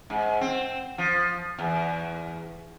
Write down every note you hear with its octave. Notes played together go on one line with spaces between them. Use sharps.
G#2
C4
F3
E2